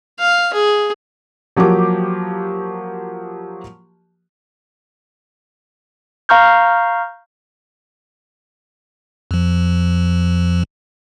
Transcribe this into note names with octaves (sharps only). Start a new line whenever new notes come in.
F5
G#4
F3 F#3 A#3 G4 D6
F5 A#5 C#6 F6 G6
F2 F3